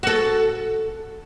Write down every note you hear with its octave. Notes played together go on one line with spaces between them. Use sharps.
F#4 A4